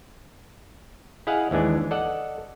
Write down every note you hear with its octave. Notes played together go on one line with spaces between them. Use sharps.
E4 G#4 D#5 F5 F#5
D#2 E3 G#3 D4
A4 D5 D#5 F#5